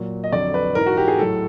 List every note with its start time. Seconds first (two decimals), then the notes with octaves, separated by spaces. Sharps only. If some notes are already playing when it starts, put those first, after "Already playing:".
Already playing: A#2 F#3
0.24 D#5
0.32 F2 D3 F#3 D5
0.54 B4
0.75 G#2 E3 A#4
0.86 F#4
0.97 G4
1.08 G#4
1.19 A2 F#3 A4